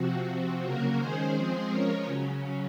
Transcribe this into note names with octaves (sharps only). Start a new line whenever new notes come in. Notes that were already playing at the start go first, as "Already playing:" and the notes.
Already playing: C3 F3 C4 F#4
C3 F3 C4 F#4
C#3 F#3 A#3 F#4 A#4
D#3 G#3 C#4 G#4 C5
F3 G#3 C4 G#4 C5
F3 G#3 C#4 A#4 C#5
C#3 F#3 C#4